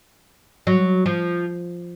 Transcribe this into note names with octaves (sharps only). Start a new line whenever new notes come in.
F#3
F3